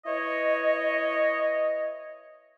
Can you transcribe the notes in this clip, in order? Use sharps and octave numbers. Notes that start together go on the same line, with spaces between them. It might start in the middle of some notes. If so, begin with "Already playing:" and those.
E4 B4 C#5 D#5